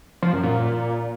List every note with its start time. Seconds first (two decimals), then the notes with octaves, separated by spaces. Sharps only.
0.23 F3
0.33 F#2
0.43 A#2